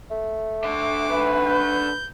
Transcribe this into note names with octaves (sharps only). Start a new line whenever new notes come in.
A3
D3 E5 D6
B4
G6